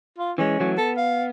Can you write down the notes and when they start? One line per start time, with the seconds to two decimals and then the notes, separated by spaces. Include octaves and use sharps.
0.18 F4
0.38 E3 G#3 C#4
0.60 E3 F#3 A3
0.77 B3 A4
0.97 F5